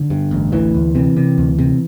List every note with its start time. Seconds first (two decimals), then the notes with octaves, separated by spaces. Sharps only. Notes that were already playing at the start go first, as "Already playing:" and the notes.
Already playing: D3
0.10 G2
0.31 A1
0.52 D2 E3
0.74 D2
0.95 C3 E3
1.16 C3
1.38 D2
1.59 C3